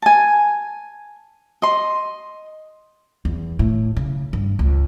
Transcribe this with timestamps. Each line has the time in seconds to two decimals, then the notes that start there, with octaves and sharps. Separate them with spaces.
0.02 G#5 A5
1.62 D#5 C6
3.25 E2
3.59 A2
3.96 C#3
4.33 G2
4.59 C#2